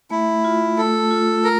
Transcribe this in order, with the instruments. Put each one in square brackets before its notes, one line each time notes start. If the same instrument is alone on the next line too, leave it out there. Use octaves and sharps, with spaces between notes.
[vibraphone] A3 [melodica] E4
[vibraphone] F4
[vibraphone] A3 [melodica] A4
[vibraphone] F4
[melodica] A#4